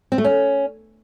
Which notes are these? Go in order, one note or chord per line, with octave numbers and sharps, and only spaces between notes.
C4
A3
C#4